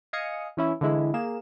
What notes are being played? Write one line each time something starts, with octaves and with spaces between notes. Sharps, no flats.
D#5 F5 G#5 D#6 C#7
E3 C#4 E4
D3 E3 G#3 E4
A#3 G#4 E7